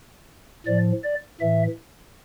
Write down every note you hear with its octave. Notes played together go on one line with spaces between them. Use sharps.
A2 F3 D5
D5
A2 E3 E5